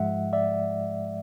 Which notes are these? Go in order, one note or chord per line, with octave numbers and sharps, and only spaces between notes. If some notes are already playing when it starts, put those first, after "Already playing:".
Already playing: G#2 F3 G#3 E5 F#5
D5 E5